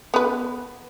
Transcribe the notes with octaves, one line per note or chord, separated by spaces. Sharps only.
B3 B4